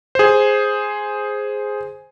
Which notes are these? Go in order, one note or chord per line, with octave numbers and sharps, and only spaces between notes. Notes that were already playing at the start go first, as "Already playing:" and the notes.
G#4 C5